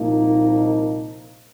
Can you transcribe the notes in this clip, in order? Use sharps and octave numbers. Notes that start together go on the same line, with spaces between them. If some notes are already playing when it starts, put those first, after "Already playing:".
Already playing: C2 A#2 F3 A#3 D#4